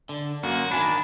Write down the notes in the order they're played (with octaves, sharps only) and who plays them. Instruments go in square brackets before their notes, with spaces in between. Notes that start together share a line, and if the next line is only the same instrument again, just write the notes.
[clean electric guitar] D3
[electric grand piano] F#2 [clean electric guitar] A#3 [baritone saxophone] F#4
[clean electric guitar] D#3 A5 [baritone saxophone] D4 [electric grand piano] G#5 B5